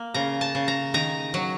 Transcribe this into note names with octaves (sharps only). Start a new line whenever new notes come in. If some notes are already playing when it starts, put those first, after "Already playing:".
Already playing: A#3
C#3 A#5
A5
C#3
A#5
D#3 A#5
F#3